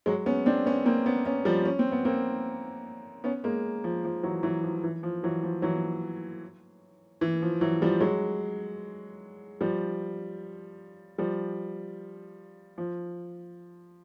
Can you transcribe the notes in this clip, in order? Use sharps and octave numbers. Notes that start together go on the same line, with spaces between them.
F#3 G#3
B3 C#4
C4 D4
B3 C#4
A#3 C4
B3 C#4
B3 C#4
F3 G3
C#4
C4
B3
A#3 C4
B3 C#4
G#3 A#3
F3
F3
E3 F#3
E3 F#3
F3
E3
F3
E3 F#3
F3
E3 F#3
E3
F3
E3 F#3
F3 G3
F#3 G#3
F3 G3
F3 G3
F3